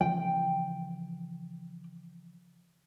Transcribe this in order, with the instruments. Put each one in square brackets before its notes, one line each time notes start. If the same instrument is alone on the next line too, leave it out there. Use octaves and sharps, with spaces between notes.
[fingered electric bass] C#3 E3 F3 [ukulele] G5